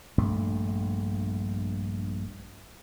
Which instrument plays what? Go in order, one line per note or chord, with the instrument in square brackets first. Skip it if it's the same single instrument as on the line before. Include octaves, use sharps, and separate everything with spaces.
[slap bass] A#1 G2 A3